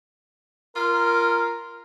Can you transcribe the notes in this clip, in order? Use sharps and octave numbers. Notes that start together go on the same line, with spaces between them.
F4 A#4